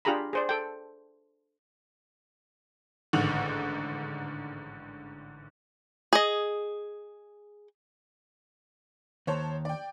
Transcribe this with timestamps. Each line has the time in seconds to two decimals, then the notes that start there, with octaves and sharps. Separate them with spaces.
0.05 D4 F4 G4 G#4 A#5 B5
0.33 G#4 C5 D5
0.49 A4 G5
3.13 A1 G#2 D3 D#3 F7 F#7
6.13 G#4 D#5
9.27 D#2 C5 C#5 A5
9.65 D5 G5